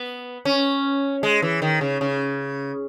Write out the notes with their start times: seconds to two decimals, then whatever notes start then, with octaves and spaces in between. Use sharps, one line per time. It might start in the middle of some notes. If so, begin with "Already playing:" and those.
Already playing: B3
0.45 C#4
1.23 G#3
1.42 E3
1.62 D#3
1.81 C#3
2.01 C#3